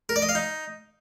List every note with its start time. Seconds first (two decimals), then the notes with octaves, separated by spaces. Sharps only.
0.09 A#4
0.16 D5
0.22 D#5
0.29 F5
0.35 D#4